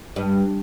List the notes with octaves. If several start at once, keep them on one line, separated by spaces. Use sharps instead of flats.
G2